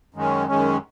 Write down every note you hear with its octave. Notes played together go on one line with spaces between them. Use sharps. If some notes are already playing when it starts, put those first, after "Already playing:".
F#2 D#3 G#3 C#4
F#2 D#3 G#3 C#4